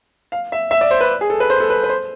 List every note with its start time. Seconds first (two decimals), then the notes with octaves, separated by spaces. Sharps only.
0.32 F5
0.52 E5
0.71 E5
0.81 D5
0.91 C5
1.01 B4
1.21 G#4
1.30 A4
1.40 B4
1.50 C5
1.60 A4
1.70 B4
1.84 B4
1.89 C5